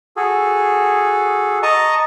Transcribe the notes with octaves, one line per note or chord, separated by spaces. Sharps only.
F#4 G#4 A4
D#5 A5 A#5 C#6 D#6